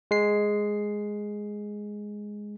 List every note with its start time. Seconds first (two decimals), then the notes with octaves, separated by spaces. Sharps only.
0.11 G#3 C7